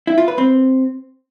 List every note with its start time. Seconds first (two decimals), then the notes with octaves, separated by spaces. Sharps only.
0.07 E4
0.18 F4
0.28 B4
0.38 C4